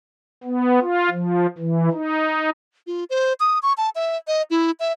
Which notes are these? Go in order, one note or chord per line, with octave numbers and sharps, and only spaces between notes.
B3
F4
F3
E3
D#4
F4
C5
D#6
C#6
A5
E5
D#5
E4
E5